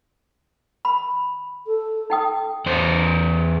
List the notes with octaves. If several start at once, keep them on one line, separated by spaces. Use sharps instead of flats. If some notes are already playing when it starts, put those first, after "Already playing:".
B5
A4
D#4 G5 D#6
E2 C5